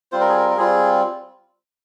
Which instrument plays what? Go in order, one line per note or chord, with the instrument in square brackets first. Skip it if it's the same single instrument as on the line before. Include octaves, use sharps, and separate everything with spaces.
[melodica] G3 C4 F4 C5
A#4
G#4
A#4
A#4
G3 C4 F4 G#4